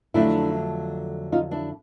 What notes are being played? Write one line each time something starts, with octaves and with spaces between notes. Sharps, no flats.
F2 D3 F#3 A3 D4 E4
D#4 F4
D4 E4